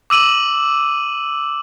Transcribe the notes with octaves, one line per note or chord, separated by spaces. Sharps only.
D6 E6 D#7 F#7